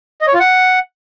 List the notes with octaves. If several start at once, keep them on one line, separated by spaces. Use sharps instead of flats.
D#5
C#5
F4
F#5